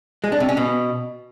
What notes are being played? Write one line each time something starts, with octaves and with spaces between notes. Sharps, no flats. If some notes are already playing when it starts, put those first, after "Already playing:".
G#3
D4
C3
C#4
B2